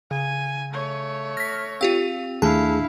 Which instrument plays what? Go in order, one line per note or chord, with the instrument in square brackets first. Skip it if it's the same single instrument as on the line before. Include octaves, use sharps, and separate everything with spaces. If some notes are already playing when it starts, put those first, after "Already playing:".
[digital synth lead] C#3 [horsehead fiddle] G#5
[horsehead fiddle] A3 C#5
[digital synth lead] F6 [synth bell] A#6 B6
[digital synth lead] C4 [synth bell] F4 G4 F5
[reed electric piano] D#2 A3 G#4 [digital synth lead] D4 [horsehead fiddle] E4 F5 [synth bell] A5